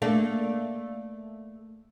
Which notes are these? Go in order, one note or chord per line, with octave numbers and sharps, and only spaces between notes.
A3 A#3 D4